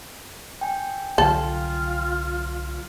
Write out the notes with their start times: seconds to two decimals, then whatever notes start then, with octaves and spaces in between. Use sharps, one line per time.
0.61 G5 G#5
1.18 C2 D3 F#3 F4 A4